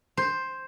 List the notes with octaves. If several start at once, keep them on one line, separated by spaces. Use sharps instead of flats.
C5